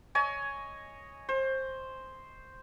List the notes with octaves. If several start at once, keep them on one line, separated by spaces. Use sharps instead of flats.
C#5 D#5 G#5
C5